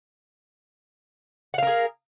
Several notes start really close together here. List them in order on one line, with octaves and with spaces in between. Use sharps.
F#5 F5 A#4 G#4